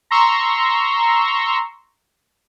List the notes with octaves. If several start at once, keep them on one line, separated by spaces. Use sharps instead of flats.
A#5 C6 C#6 E6